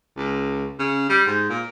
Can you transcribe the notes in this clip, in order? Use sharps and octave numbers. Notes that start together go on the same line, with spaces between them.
C#2
C#3
G3
G#2
A#2